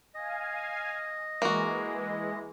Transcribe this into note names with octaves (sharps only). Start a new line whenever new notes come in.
D#5 F5 G#5
E3 G#3 A#3 F#4